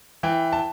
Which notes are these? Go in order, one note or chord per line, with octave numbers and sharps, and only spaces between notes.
E3 G5
A5